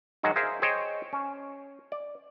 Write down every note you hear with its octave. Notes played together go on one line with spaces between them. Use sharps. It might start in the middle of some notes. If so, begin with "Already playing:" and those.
D#3 F#3 G#3 D#4 F#4
G#4 A#4 C5 E5 F5
G#4 C5 C#5 D#5 G5
C#4
D5